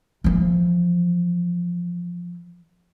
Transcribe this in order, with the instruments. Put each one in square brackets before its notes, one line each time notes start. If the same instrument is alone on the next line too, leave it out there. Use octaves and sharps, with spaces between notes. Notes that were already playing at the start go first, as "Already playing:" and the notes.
[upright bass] E3 F3